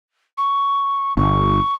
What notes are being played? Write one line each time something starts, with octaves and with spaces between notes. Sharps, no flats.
C#6
G1 C#6